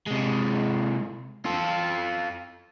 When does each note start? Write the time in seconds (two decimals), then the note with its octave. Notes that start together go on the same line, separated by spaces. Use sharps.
0.06 C3 G#3
1.45 F4 A4